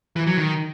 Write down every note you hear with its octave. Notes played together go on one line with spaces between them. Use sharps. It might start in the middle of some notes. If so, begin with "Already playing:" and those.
E3
F#3
D#3